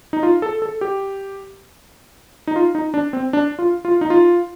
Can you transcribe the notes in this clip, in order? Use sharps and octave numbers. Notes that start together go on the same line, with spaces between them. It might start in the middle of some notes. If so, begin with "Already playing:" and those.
D#4
F4
A4
A4
G4
D#4
F4
D#4
D4
C4
D4
F4
F4
D#4
F4